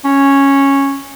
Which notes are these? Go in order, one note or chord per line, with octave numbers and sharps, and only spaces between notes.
C#4